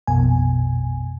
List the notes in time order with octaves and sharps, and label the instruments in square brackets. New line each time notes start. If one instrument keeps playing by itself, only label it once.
[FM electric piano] A#1 F2 B2 G#5